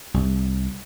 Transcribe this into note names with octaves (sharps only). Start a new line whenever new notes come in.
C2